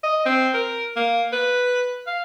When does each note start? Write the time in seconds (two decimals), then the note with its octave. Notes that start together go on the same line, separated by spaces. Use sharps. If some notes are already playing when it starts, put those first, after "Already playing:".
0.03 D#5
0.26 C4
0.54 A#4
0.96 A#3
1.33 B4
2.07 F5